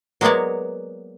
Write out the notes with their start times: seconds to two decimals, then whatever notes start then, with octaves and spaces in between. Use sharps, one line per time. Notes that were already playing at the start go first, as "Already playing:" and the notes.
0.21 F#3 G#3 A#3 B3 C#5 D5